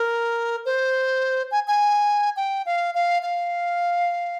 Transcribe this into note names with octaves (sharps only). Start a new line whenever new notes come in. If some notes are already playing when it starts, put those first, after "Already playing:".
Already playing: A#4
C5
G#5
G#5
G5
F5
F5
F5